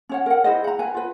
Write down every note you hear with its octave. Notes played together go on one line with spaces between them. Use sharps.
C#4 C#5 F#5
A#4 F#5
E4 G#4 C5 D#5
F#5 A#5
B4 F#5 G#5
F4 B4